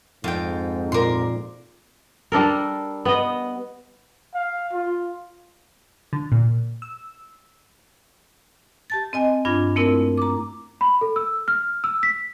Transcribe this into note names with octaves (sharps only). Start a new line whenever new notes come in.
F2 G#2 F4 G5
A#2 F4 A#4 C6 D6
G3 D4 A4 A#4
B3 D#5
F5
F4
D3
A#2
E6
G4 A5 A6
C4 D#5 G#5
G2 D4 F4 G#6
A3 A#3 C4 E4 A#4
A#5 D6
B5
A4
E6
F6
E6
B6